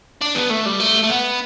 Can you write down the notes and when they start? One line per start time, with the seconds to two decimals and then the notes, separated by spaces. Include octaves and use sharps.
0.21 D4
0.35 B3
0.50 A3
0.66 G3
0.80 A3
1.03 A3
1.10 B3